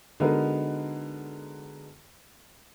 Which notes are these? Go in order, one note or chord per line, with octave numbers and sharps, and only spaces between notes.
D3 G#3 B3 D#4 F#4 A#4